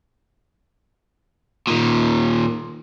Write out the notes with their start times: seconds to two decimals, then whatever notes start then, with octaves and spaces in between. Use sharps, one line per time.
1.67 A#2 D#3